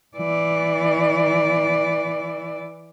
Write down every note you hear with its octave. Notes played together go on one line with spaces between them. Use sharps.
E3 D5